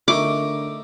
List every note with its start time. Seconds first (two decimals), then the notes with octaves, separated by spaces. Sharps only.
0.08 D3 A3 D#4 A#4 C#6 D6